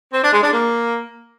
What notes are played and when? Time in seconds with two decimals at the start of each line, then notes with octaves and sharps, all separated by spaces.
0.13 C4
0.23 D4
0.33 G#3
0.42 D4
0.52 A#3